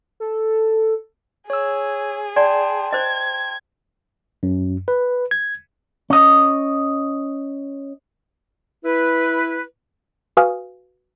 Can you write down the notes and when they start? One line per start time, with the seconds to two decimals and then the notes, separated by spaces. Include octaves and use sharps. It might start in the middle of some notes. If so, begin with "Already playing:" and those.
0.20 A4
1.50 G#4 C#5 E6
2.36 D5 G5 A5 C6
2.92 C5 D#5 G#6
4.43 F#2
4.88 B4
5.31 G#6
6.10 C#4 D#5
8.85 E4 B4
10.37 F#4 B4 F5 G#5 D#6 F6